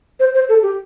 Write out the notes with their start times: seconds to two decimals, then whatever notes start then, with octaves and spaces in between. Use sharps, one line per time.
0.19 C5
0.34 C5
0.49 A4
0.62 G4